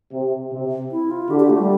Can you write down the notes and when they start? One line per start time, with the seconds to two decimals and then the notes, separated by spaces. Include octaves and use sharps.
0.13 C3
0.52 C3
0.91 E4
1.11 F4
1.30 D3 G4
1.40 G4
1.50 A3
1.59 G3